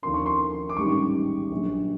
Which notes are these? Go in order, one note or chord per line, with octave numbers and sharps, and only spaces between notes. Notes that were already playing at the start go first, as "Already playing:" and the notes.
D#2 D3 F3 A#3 D4 C6
C#6
C6
D6
A1 G#2 D#3 G3 C#6
A#1 A#2 F#3